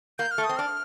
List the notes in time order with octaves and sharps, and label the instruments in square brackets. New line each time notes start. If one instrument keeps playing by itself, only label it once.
[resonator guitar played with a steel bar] A#3 [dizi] G6
[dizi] F6
[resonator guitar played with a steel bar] A3
[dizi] D#6
[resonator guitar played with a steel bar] C4
[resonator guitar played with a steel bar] D4 [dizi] F6